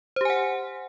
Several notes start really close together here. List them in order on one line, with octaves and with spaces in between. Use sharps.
C5 G4 G#5 F#5